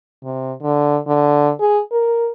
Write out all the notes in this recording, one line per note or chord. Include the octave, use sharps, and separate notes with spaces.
C3
D3
D3
G#4
A#4